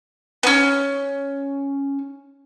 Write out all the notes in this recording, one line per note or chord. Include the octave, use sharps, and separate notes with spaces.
B3 C#4